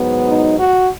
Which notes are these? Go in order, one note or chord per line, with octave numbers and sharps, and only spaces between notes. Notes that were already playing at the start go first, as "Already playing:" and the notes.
Already playing: G#2 F#3 B3
D#4
F#4